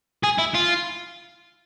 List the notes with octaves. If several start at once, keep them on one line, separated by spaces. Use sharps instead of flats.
G#4
E4
F4